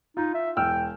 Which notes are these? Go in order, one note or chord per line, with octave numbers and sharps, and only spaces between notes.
D#4 F4
E5
E1 G5 E6 F6